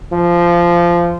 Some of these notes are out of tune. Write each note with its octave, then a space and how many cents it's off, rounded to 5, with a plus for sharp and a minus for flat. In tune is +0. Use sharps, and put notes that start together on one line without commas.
F3 -15